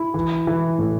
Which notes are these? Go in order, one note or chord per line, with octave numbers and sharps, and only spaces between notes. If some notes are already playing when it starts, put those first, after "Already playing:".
Already playing: E4
E3
E3
A2